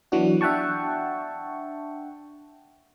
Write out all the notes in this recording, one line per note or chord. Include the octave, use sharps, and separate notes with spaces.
E3 F#3 B3 D4 F#4
D4 E5 F#5 G5 A5 C#6